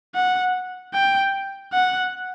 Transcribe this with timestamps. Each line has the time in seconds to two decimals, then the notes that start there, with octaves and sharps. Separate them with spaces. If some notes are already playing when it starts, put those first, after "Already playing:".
0.15 F#5
0.94 G5
1.73 F#5